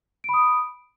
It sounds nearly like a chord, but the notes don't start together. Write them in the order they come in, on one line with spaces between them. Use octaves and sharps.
D7 B5 D#6